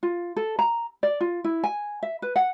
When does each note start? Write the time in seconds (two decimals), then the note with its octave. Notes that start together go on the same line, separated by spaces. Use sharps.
0.03 F4
0.36 A4
0.59 A#5
1.03 D5
1.21 F4
1.44 E4
1.64 G#5
2.03 E5
2.22 B4
2.36 F#5